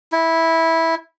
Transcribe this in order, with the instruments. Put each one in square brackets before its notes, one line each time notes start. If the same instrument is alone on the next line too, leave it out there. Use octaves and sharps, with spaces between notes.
[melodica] E4